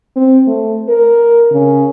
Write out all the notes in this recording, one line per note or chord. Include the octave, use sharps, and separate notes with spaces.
C4
A3
A#4
C#3